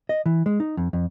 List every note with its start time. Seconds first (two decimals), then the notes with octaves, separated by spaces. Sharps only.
0.09 D#5
0.26 E3
0.46 G#3
0.60 D#4
0.77 F2
0.93 F2